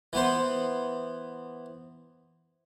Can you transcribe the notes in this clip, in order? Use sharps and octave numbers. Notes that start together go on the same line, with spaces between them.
E3 B3 C5